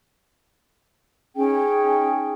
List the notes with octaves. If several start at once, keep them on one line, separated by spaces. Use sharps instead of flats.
C#4 D#4 G#4 G5